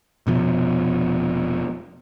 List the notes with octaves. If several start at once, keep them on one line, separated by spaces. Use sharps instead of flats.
F1 B2 F3